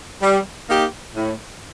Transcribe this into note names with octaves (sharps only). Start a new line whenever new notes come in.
G3
A#3 D#4 G4
A2